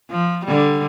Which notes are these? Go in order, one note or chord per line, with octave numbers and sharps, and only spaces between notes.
F3
D3 G3